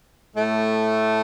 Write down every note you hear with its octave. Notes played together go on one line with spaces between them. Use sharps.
A2 A3